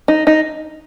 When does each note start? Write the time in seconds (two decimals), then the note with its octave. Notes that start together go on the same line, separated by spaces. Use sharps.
0.08 D#4
0.27 D#4